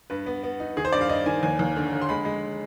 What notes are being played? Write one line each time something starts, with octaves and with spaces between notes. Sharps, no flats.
G2 B4
B3
B3
D#4
D#3 G#4
C5
G2 D5
F5
G2 D#5
D#3 G#5
D#2 G#5
D#2
D3
D3
C6
G#3 B5
G#3